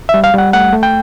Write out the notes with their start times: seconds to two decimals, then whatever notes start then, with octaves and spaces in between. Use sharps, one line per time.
0.09 G3 E5
0.24 F5
0.34 G3 F#5
0.53 A3 F#5
0.73 A3
0.83 G5